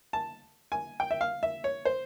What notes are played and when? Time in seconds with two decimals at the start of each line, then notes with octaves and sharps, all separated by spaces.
0.13 A5
0.72 G#5
1.00 G5
1.11 E5
1.21 F5
1.43 E5
1.64 C#5
1.85 C5